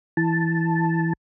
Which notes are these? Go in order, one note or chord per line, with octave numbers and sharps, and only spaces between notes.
E3 A5